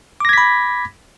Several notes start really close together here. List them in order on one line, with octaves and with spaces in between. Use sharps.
D6 A#6 G#6 B6 B5